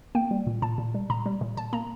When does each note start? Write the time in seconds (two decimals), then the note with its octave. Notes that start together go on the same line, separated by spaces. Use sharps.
0.15 A#3 G5
0.31 G3
0.47 A#2
0.62 A#2 A5
0.78 A#2
0.94 G3
1.10 A#2 A#5
1.26 G3
1.41 A#2
1.57 A#2 A5
1.73 A#3 A#5